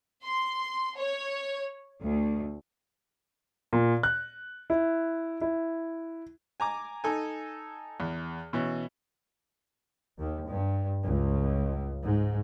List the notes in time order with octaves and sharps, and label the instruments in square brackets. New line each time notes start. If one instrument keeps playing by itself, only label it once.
[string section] C6
C#5
D2
[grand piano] A#2
F#6
E4
E4
[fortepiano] G#5 A#5 D6
D#4 A4 G#5
E2
B2 E3 C#4
[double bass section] D#2
G2
C#2
G#2